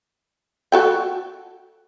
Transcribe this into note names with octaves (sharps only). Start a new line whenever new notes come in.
F#4 A4 G5